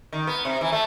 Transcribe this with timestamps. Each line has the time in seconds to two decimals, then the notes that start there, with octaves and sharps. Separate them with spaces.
0.12 D#3
0.27 B3
0.45 C3
0.61 E3
0.72 A3